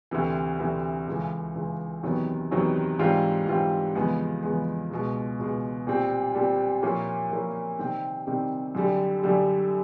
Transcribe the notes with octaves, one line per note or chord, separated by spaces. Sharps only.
D2 C3 E3
D2 C3 E3
C#2 C#3 E3
C#2 C#3 E3
E2 C3 D#3 F#3 B3
E2 C3 D#3 F#3 B3
G#2 E3 G3 C4 F4
G#2 E3 G3 C4 F4
E2 C#3 F3 G#3 B3
E2 C#3 F3 G#3 B3
C#2 B2 G#3
C#2 B2 G#3
A#2 G3 C4
A#2 G3 C4
A#2 F3 A#3 C#4 E4
A#2 F3 A#3 C#4 E4
C3 D#3 G3 C4
C3 D#3 G3 C4
F#2 D3 G3
F#2 D3 G3